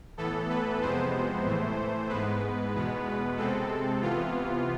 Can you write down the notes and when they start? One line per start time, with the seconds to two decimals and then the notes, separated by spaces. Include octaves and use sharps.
0.17 A2 E3 B3 A4
0.49 B4
0.82 F2 C3 G#3 B3 C5
1.45 A2 E3 A3
2.09 G#2 G#3 B3 B4
2.74 E2 B2 G#3 B3
3.37 C3 G#3 C4 A4
4.02 C3 E3 B3 F4